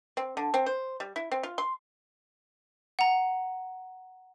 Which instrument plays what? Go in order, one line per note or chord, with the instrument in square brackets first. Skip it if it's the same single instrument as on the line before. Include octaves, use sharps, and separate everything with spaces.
[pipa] C4
D3
C4
C5
G3
E4
C4
F4
C6
[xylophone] F#5 A#5